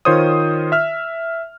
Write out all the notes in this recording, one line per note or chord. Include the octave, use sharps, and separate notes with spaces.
D#3 F4 C5 C#5 D#6
E5 F6